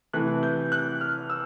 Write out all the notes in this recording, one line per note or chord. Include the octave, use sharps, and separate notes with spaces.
C3 E3 A3 F#6
G6
F#6
F6
E6